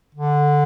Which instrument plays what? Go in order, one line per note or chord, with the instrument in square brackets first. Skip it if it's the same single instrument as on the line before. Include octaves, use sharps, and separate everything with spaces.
[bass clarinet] D3